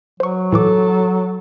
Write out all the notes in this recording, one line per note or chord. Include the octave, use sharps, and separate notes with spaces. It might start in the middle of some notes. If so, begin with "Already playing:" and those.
F#3 C5 C#6
A2 E3 A4 D6